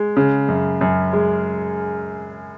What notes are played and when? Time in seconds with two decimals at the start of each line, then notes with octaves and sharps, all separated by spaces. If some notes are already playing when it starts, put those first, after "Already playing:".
Already playing: G#3
0.17 C#3
0.49 F#2
0.81 F#2
1.13 G#3